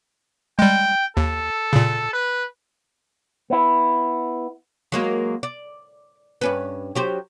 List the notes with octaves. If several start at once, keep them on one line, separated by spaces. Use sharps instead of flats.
G3 G#3 G5
D#2 A4
A#2 C#3
B4
B3 E4
F#3 G#3 A#3
D5
G2 C#4 B4
F#3 G4 C5